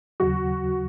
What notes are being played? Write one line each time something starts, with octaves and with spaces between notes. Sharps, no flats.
D#2 C#3 F#3 F#4